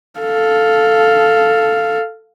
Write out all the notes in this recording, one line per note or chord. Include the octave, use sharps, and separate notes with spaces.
A4 F5